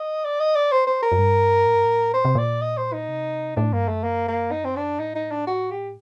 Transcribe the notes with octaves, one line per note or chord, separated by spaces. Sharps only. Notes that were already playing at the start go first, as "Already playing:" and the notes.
Already playing: D#5
D5
D#5
D5
C5
C5
A#4
F#2
G2
A2
G2
A2
A#2 C5
C3
A#2 D5
D#5
C5
D#4
C3
A2 D4
G2 A#3
F#2 A3
A#3
A#3
D#4
C4
D4
A2 D#4
D#4
D4
F#4
G4